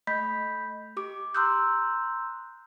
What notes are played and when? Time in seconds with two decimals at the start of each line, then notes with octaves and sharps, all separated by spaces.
0.07 A3 D#5 B5 G6 B6
0.97 G4 D6
1.35 A#5 C6 D#6 E6 F#6 G6